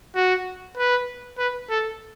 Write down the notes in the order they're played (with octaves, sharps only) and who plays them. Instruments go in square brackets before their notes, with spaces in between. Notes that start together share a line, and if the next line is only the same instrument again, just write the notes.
[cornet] F#4
B4
B4
A4